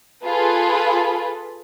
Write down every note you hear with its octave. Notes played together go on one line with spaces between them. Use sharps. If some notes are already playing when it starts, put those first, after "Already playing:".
F4 G#4 A4 B4